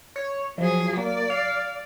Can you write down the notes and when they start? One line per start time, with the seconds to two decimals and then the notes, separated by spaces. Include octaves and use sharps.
0.16 C#5
0.58 F3 F#3 G#4
0.97 A#3 D5
1.30 F5